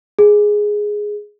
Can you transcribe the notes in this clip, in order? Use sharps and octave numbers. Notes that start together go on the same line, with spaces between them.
G#4